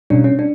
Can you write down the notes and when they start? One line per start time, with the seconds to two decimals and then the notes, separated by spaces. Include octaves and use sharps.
0.10 B2 G3 C#4 D4
0.24 C#4
0.39 D4